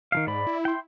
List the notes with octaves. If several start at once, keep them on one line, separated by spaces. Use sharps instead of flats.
D#3 F3 F5
G#2 D5 B5
E4
G5 C6